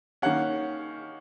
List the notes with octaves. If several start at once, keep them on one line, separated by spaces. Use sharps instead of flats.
D#3 A#3 C#4 F#5